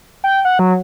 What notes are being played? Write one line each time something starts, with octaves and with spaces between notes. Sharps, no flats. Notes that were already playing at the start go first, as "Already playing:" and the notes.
G5
F#5
F#3